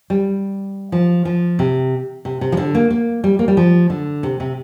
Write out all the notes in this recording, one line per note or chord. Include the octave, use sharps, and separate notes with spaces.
G3
F3
F3
C3
C3
C3
F3
D3
A#3
A#3
G3
A#3
G3
F3
D3
C3
C3